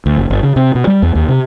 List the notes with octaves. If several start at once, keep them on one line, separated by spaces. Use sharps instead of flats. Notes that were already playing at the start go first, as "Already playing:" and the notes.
D2
F#1
G1
C#3
C3
B2
G3
E2
D#2
C3